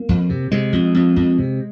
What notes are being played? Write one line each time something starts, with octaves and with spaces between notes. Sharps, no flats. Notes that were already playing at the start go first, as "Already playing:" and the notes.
Already playing: A#3
F2
C3
C3 G#3
F2
F2
F2
C3